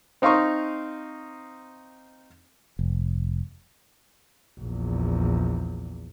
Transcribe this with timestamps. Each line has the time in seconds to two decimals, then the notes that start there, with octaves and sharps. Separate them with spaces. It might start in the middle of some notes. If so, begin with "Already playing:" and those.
0.22 C4 D#4 F5 C6 C#6 D#6
2.79 F1
4.60 A#1 E2